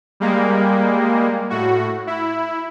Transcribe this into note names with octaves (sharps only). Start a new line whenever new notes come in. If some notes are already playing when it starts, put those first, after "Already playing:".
G3 G#3 A#3
A2 F#4
E4